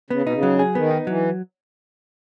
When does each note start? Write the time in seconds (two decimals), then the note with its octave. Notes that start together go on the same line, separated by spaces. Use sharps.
0.10 C#3 B3
0.22 B2 D#4
0.33 C#3
0.43 F#3
0.59 G#4
0.75 D#3 B3
0.91 D#4
1.07 E3 F#3